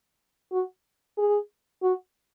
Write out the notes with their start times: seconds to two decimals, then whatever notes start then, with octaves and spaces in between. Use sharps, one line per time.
0.52 F#4
1.18 G#4
1.83 F#4